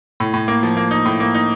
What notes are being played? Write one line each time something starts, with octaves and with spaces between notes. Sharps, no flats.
A2
A2
A#3
F3
A#3
D#4
A2
A#3
D#4